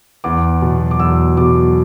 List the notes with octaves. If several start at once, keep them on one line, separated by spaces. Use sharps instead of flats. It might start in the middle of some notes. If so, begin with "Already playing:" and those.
E2 D6
B2 F#3
D6
E2 E6
B2 F#3 D6